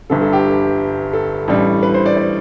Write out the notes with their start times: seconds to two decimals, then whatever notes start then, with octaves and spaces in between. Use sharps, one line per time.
0.10 G1 G2 D3 A4
0.21 A4
0.33 G4
1.13 A4
1.48 A1 A2 G3 D4
1.83 B4
1.94 C5
2.06 D5
2.17 D5